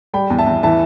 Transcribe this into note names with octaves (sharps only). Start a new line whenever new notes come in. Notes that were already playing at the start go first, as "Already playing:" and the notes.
G3 G5 B5
E2
E5 A5
E2
E3 E5 A5